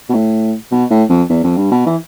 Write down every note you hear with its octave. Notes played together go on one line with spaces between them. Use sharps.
B2
A2
B2
A2
F2
E2
F2
G2
B2
E3